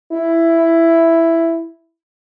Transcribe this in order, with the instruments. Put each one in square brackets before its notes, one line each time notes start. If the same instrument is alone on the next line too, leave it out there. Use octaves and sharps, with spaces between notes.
[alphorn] E4